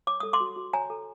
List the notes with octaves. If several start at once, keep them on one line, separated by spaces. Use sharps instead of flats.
C#5 D6
A4 D#6
C6 D6
F#4
F#4
C#5 G#5 A#5
A4